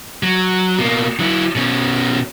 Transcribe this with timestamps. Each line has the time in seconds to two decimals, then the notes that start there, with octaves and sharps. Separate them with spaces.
0.23 F#3
0.79 B2 A#3
1.20 F#3 E4
1.55 B2 C#4